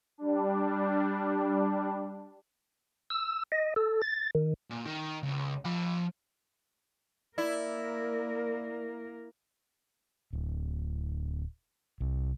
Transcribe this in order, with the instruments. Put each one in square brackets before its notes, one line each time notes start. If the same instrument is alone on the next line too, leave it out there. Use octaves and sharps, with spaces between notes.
[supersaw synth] G3 D4
[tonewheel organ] E6
D#5
A4
A6
D#3
[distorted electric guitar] A#2
D#3
C#2
F3 B5
[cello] A#3 A#4 [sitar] E4 [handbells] D5
[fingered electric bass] D1
C2